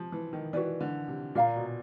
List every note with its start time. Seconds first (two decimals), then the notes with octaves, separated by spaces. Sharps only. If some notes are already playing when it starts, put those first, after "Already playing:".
Already playing: C3 F3
0.12 E3
0.33 D#3
0.53 E3 F#4 B4 D5
0.81 D3
1.08 C3
1.35 A#2 A#4 D5 F5 A#5
1.56 B2